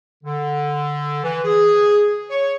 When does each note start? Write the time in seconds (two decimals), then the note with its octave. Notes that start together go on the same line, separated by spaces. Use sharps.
0.24 D3
1.23 E3
1.44 G#4
2.30 C#5